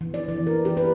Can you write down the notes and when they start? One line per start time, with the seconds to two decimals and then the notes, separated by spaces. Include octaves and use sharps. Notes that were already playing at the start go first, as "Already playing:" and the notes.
0.01 E3
0.14 D5
0.28 E3
0.47 A#4
0.65 G4
0.77 B4